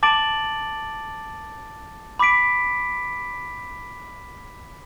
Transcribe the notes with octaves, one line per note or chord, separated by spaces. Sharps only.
A5 D6 A6 D7 F#7
B5 D6 B6 D7